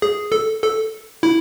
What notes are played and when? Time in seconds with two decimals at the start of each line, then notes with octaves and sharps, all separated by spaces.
0.02 G#4
0.32 A4
0.63 A4
1.23 E4